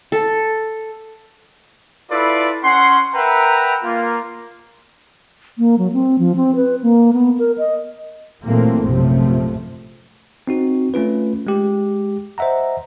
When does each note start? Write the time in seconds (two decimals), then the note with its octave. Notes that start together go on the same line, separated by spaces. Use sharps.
0.12 A4
2.11 E4 F4 A4 B4 D5 E5
2.63 C#4 F#5 C6
3.14 A#4 B4 E5 F#5 G5 A#5
3.83 A#3 F4
5.58 A#3
5.78 F#3
5.94 C4
6.19 F3
6.36 C4
6.55 B4
6.83 A#3
7.14 B3
7.39 A#4
7.58 D#5
8.43 A#2 E3 F#3 A3 A#3 C4
8.83 A#1 F#2 C3 F3 A3
10.47 C4 D#4 F#4
10.94 A3 C#4 F4 B4
11.47 G#3 G4
12.38 C5 D#5 E5 F#5 A#5